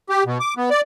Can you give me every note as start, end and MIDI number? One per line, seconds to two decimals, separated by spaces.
0.09 0.23 67
0.26 0.38 47
0.40 0.54 86
0.57 0.70 59
0.71 0.81 74